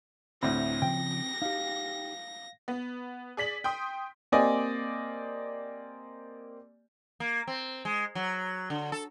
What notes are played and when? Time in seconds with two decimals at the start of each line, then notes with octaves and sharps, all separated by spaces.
0.43 D2 A2 C4 B5 A#6
0.82 C#3 F3 G5
1.42 D#4 G4 F5
2.68 B3
3.37 G#4 D5 B6 F#7
3.64 G5 C6 D#6
4.32 A#3 C4 G4 D5 D#5 G#5
7.20 A#3
7.48 C4
7.85 G#3
8.15 F#3
8.70 D3
8.92 A4